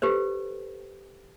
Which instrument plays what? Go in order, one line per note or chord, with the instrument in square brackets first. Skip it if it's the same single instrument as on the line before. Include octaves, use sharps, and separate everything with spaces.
[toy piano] G4 A4 B4 C5